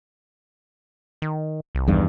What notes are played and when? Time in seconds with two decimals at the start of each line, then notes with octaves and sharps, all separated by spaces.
1.22 D#3
1.75 C2
1.88 E2 G2 D#3